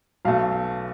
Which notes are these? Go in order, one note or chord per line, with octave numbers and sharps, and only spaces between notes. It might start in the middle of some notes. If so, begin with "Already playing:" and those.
B1 B2 A3 F5
F5